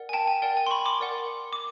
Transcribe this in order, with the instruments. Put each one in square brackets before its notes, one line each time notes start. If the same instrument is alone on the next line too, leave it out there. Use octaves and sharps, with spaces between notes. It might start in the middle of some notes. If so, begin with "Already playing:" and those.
Already playing: [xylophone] A#4 D5 F#5
G#5
G5 A5
G#5
A#4 D5 F#5 G5
G#5
C6
B5 C#6
C6 D6
A#4 D5 F#5
D6